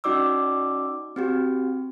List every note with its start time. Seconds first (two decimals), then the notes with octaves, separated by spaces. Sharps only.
0.04 C#4 D#4 F#4 D5 D6 E6
1.16 C4 F#4 G4